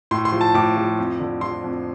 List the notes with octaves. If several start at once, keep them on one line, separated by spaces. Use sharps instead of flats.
A2 C6
C6
F3
A5
A2 D6
F3
F2
D3
F3 C6
F2